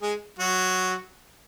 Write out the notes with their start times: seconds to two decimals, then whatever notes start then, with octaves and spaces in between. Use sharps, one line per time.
0.02 G#3 G#4
0.39 F#3 F#4